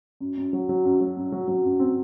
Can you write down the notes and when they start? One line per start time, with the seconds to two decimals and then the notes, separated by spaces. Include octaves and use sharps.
0.20 F#2
0.37 F#2
0.53 F#3
0.69 F#3
0.85 F#2
1.01 F#3
1.17 F#2
1.32 F#3
1.48 F#3
1.64 F#2
1.79 C4